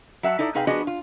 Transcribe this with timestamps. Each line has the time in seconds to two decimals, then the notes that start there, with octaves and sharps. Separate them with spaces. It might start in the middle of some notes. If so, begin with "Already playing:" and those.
0.23 F#3 E5 F#5 A5
0.39 D#4 E4 A4 D5
0.54 C3 D#4 G#4 B4 F5 G5
0.67 F3 B3 D4 F#4 G#4 D#5
0.87 F4